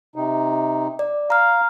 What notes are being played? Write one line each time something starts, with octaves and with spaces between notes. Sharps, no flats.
C3 D#4
D5
F5 A#5 F6